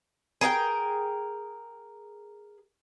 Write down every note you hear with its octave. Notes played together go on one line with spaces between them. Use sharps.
G#4 A#4 F#5 G5